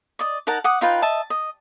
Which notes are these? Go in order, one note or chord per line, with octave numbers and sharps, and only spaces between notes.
D5 D#5
D#4 A#4 F#5 A5
F#5 D6 D#6
D#4 F4 B4 G5
D#5 E5 A5
D#5